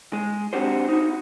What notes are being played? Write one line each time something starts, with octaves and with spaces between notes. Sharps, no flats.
G#3
C4 D4 F#4 G4 C5
D#4 F#4